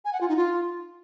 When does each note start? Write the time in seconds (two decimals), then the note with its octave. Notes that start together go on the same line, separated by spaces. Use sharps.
0.05 G#5
0.13 F#5
0.21 F4
0.28 D#4
0.36 F4